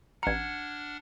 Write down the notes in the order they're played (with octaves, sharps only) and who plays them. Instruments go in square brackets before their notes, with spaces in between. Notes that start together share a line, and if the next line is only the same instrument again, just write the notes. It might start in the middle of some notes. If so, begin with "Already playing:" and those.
[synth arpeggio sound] A1 A#5 [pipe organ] D4 F#5 F6 [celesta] G#6 C#7